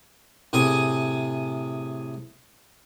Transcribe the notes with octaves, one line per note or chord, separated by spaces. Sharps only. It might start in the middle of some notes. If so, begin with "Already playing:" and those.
A2 C3 G#4 G#5